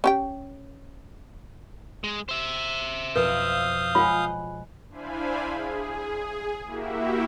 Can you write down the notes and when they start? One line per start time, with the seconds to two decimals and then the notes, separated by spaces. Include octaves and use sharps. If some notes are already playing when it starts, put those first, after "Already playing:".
0.04 C#4 G4 G5
2.04 G#3
2.29 C5 E5
3.16 F2 B2 B4 F5 D#6 G6
3.95 G#3 F4 C#5 F#5 B5
4.90 D4 E4 C5 F5 G#5 B5
5.45 G#4
6.65 A#3 E4 F#4 G4 E5